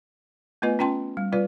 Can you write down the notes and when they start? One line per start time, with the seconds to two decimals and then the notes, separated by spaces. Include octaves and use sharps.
0.62 A3 B3 F4 B4 D#5 G#5
0.79 C#4 F4 G5 A5 C6
1.17 G3
1.33 G3 F4 B4 D5